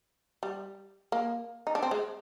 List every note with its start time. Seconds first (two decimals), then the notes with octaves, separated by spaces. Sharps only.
0.43 G3
1.12 A#3
1.67 D#4
1.75 D4
1.83 C4
1.91 G#3